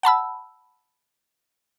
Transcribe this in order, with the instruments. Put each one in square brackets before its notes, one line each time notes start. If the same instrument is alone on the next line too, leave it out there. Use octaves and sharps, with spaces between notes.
[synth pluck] F#5 A5 B5 E6